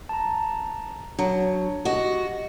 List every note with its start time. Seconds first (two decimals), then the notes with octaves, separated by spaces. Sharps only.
0.09 A5 A#5
1.19 F#3 D4
1.85 F#4 G4 D#5